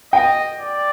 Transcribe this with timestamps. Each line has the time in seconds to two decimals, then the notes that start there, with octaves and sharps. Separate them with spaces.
0.12 D#5 G5
0.59 D5